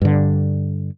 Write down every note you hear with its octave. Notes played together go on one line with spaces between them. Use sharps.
G2 D3